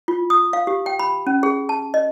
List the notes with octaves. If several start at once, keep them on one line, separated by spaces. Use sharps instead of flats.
F4
D#6
F5
G4
G5
B5
C#4
G#4
A5
D#5